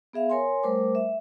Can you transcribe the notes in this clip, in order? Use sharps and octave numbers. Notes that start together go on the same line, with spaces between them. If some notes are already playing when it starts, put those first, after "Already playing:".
B3 G#4 E5 F5
A#4 C#5 G#5 C6
G3 A3 A#4 C5 D6
E5